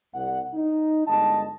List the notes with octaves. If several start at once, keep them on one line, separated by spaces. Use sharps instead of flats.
C2 F#5
D#4
G1 G#3 D#5 A5